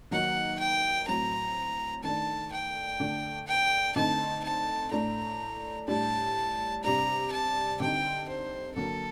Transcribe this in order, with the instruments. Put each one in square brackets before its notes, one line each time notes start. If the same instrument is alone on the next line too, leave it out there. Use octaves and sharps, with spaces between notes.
[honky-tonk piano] D#3 F#3 A#3 D#4 [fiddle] F#5
[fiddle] G5
[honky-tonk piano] A2 F#3 C4 [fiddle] A#5
[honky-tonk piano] D#3 A3 D4 [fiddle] A5
[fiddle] G5
[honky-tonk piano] D3 A3 D4
[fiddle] G5
[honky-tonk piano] D3 A3 C4 D#4 [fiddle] A5
[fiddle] A5
[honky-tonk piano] A2 A3 D4 [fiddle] A#5
[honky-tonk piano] A2 G3 D4 [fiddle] A5
[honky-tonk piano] C3 G3 D4 [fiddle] A#5
[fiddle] A5
[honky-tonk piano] D3 G3 C4 D#4 [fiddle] G5
[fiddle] C5
[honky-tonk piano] D3 F#3 A#3 [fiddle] A4